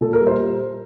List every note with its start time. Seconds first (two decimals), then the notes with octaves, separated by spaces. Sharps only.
0.01 A#2 A4
0.13 A#4
0.20 G3
0.27 C5